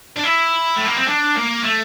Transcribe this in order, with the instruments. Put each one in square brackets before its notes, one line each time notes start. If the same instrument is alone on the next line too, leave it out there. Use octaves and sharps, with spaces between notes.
[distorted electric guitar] D4
E4
A3
A#3
C4
D4
A#3
A3